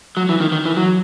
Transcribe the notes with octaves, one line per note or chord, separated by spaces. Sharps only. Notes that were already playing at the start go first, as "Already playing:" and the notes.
F#3
E3
D#3
D#3
E3
F#3